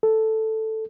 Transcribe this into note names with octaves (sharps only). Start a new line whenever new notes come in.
A4